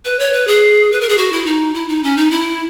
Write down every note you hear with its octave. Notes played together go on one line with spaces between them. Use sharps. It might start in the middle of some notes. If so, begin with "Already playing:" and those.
B4
C#5
B4
G#4
B4
A#4
G#4
F#4
E4
D#4
E4
D#4
C#4
D#4
E4